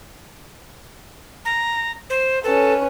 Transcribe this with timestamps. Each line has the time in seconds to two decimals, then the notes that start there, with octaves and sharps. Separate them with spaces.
1.45 A#5
2.10 C5
2.44 C#4 A4 B4